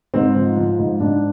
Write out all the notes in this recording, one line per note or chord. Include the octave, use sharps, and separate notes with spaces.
G#2 C4
F3
F3
G#2
G#2 D4